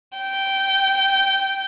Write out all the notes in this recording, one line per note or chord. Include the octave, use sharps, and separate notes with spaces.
G5